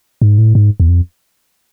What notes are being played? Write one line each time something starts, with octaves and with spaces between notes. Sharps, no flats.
G#2
A2
G#2
E2
F2